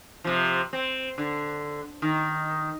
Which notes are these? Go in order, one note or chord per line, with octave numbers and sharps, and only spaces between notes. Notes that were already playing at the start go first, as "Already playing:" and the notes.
C3 F3
C4
D3
D#3